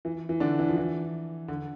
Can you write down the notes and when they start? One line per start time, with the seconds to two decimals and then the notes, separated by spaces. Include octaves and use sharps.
0.05 E3
0.29 E3
0.40 D3 D4
0.59 E3
0.68 F3
0.77 E3
1.48 D3